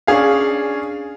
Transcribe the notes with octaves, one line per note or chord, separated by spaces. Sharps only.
C#4 D4 G#4 F5